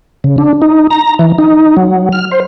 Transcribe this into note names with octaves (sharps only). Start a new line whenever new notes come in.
C#3
D4
D#4
A#5
E3
D#4
F#3
F6
C5